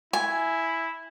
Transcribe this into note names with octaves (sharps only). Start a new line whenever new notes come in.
E4 G#5